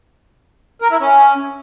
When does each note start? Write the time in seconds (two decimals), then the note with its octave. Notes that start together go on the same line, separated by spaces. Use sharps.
0.82 A#4
0.91 E4
1.00 C#4